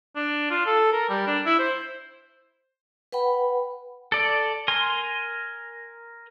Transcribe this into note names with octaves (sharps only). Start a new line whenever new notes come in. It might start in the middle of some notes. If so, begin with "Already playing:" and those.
D4
F4
A4
A#4
G3
D4
E4
C5
B4 F#5 G5 B5
A4 D5
A#4 G#5 C6